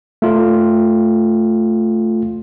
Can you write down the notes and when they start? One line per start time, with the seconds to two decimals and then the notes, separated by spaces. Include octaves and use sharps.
0.22 A3 F4